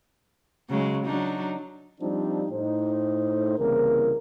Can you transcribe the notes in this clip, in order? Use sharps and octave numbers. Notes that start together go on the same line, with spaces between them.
C#3 F#3 G#3
F#3 D4 D#4
F3 G3 C4 D4 D#4 F4
A2 D#4 C5
C2 C#3 E3 A#3 A#4